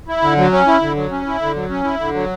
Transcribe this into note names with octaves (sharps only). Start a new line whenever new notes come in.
E4
D3
F#3
C#4
E4
D3
F#3
C#4
E4
D3
F#3
C#4
E4
D3
F#3